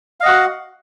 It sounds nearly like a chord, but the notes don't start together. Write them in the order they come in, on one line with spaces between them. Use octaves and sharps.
F5 D#5 F#5 F#4